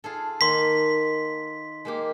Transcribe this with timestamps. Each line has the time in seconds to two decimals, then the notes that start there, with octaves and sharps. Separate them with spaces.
0.04 F4 G#4 A4
0.41 D#3 A#3 C6 B6
1.85 G#3 A#3 G4